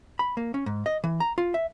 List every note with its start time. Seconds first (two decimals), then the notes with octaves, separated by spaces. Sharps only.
0.19 B5
0.37 A#3
0.54 C#4
0.66 G#2
0.86 D#5
1.04 E3
1.20 A#5
1.38 F4
1.54 E5